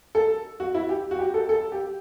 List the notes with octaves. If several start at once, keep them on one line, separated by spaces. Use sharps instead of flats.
A4
F#4
E4
G4
F#4
G4
A4
A4
G4